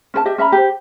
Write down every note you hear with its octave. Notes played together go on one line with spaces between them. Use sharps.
C#4 B4 A5
G4 D#5 E5
C#4 E5 A#5 B5
G4 C5